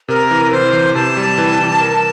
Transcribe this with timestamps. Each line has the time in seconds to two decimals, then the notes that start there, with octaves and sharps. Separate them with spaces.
0.08 C3 A#4
0.31 E3
0.52 E3 C5
0.73 E3
0.95 C3 A5
1.17 G3
1.38 E3
1.59 E3
1.81 A#4